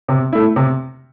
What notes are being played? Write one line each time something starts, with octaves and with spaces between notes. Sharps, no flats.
C3
A3 E4
C3